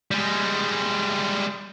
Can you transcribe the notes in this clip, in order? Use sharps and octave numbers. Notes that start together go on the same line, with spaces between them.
G3 G#3